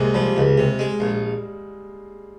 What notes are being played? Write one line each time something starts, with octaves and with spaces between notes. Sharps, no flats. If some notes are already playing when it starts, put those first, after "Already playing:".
Already playing: C2 C3 G#3 A#3
F3 G3
C#2
C3
G#3
A#1